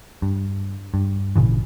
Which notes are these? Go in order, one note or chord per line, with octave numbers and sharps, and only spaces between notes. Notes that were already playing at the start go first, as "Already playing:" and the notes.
G2
G2
G#1 A#2 C#3 E3